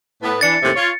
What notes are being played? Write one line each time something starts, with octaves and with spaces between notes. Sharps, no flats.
A2 B3
E3 D4 A6 C#7
D#2 A2 C3
F4 C#5